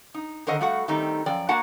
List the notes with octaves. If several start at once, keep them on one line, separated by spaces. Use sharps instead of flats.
D#4
D3 D#3 A#4 C5 D#5 F#5
G3 A3 F#4 F5 F#5
D#3 G3 A3 C4 D#4
F#2 F3 D5 G5
A#3 D4 F#4 F#5 A5